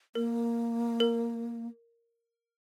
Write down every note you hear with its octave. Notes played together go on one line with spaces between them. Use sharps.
A#3 A#4
A#4